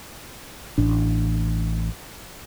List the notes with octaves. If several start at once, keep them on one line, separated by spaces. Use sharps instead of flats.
A1 A2 D4